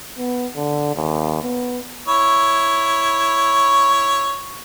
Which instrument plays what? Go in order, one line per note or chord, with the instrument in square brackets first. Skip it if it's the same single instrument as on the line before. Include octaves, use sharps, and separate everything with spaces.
[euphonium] B3
D3
D#2
B3
[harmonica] E4 C#5